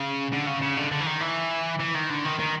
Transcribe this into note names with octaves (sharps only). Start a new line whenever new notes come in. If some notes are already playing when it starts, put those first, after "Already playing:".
Already playing: C#3
D3
C#3
C#3
D3
D3
E3
D#3
E3
E3
D#3
D3
D#3
D#3